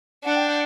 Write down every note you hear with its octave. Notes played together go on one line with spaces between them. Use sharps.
D4 F#5
G5
F#5